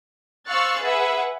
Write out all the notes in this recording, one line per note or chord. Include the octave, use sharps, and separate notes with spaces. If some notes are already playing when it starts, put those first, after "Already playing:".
C5 F5 C#6 E6 F#6 A6
G#4 B4 E5 F#5